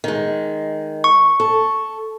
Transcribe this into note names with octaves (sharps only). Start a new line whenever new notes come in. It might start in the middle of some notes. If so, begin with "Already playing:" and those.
D#3 G#3
C#6
A4